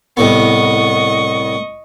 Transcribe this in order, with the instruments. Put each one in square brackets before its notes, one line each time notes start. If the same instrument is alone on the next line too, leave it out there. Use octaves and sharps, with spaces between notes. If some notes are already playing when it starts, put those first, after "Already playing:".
[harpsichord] C2 A2 B3 [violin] D#5 C#6